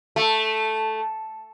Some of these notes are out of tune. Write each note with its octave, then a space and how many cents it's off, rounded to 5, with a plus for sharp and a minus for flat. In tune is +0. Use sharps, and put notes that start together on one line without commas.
A3 -5